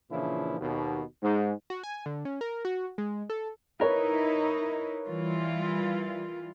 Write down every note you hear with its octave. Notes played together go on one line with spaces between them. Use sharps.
A#2 C#3 E3 F3 D4 E4
D#2 B2
G#2
F#4
G#5
D3
C#4
A#4
F#4
G#3
A4
D#4 E4 A#4 B4 C#5
E3 G3 F4